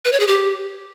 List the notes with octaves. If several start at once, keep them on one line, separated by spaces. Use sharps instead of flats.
B4
C#5
G#4
G4